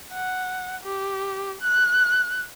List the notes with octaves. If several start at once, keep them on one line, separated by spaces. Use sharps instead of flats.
F#5
G4
F#6